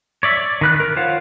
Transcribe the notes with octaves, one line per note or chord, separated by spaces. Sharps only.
C#5 D5 E5
D5
D#3 B4 F#6
A#4
F4 C5 C#5 F5 F#5